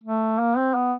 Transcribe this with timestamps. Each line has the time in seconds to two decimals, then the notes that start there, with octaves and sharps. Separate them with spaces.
0.03 A3
0.39 A#3
0.57 C4
0.75 B3